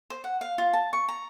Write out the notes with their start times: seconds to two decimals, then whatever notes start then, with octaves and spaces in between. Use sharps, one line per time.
0.10 C5
0.24 F#5
0.41 F5
0.58 F4
0.73 A5
0.93 C#6
1.09 A#5